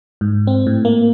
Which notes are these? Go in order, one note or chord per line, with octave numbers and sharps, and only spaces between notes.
G#2
C4
A2
A#3